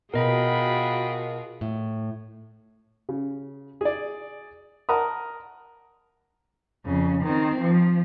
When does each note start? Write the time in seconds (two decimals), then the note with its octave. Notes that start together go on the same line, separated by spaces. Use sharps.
0.14 B2 F4 F#4 G#4 A#4 D#5 G5 B5
1.61 A2
3.09 C#3
3.81 G#4 D5
4.89 A#4 F#5 A5 A#5 D#6
6.86 F2 C#3
7.24 D#3 C4
7.60 F3